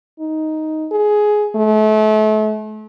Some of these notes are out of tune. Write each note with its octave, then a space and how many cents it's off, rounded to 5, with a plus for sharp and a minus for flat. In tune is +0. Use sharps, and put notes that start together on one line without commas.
D#4 +5
G#4 +15
A3 -35